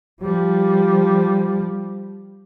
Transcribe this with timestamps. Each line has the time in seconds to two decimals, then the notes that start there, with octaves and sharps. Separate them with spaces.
0.22 F3 G3